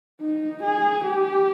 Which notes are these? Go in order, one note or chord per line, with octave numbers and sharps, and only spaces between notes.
D#4
G#4
G4